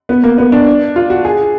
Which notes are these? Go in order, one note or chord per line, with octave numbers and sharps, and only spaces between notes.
B3
A#3
B3
D4
F4
F#4
G#4